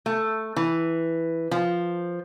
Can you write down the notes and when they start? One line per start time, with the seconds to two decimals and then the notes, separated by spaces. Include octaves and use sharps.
0.06 A3
0.56 E3
1.51 F3